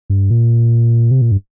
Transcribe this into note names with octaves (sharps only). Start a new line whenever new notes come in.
G2
A#2
C3
A#2
G2